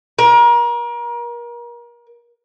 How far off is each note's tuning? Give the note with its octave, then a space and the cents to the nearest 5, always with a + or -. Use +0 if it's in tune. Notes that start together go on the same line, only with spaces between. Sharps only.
A#4 +35